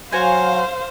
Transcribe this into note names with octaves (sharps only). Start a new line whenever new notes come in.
F#3 F#4 C5 F5 G#5